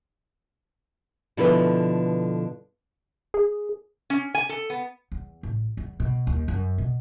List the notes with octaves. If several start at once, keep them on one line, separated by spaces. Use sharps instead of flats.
B2 D3 F3 E4 A4 B4
G#4
C#4
G#5
A4
B3
E2
A1
E2
B2
D#2
F#2
B2